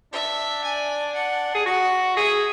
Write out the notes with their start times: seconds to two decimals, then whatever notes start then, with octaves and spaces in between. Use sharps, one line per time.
0.13 D4 E5
0.64 G#5
1.15 F#5
1.55 G#4
1.66 F#4 F#5
2.16 G#4 E5